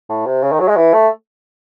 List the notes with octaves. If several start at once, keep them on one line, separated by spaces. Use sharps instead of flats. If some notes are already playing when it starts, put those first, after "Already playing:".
A2
C3
C#3
D#3
F#3
G#3
E3
A3